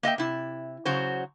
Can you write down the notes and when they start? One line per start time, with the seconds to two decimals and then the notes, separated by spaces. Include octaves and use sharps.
0.03 A#3 D#5 E5 G5
0.18 C3 E4
0.85 C#3 F#3 F#4 C5